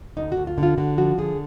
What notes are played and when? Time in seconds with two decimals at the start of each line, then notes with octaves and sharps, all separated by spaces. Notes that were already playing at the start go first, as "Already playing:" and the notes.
0.17 D2 D#4
0.32 F#4
0.37 D2
0.47 F4
0.58 D3
0.63 F4
0.78 D3 F#4
0.97 F3 F#4
1.18 D3 G#4